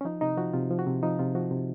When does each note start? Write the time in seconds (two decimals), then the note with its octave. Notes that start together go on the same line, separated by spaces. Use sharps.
0.01 C#4
0.05 F3 D#4
0.21 C3 D#4
0.37 F3 F#4
0.53 C3 F4
0.70 F3
0.79 F#4
0.87 C3
1.03 F3 D#4
1.19 C3 F4
1.35 F3 F#4
1.51 C3